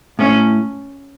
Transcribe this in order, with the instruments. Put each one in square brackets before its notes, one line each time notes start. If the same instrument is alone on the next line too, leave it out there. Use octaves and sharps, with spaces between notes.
[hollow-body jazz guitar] A2 [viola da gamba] C#4